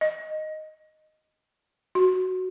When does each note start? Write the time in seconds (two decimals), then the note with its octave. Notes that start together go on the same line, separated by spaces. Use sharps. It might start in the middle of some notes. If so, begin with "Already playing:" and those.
0.01 D#5
1.95 F#4